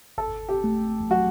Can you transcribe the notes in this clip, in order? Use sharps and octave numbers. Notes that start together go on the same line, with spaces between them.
G1 A4
G4
A3
F#3 F#4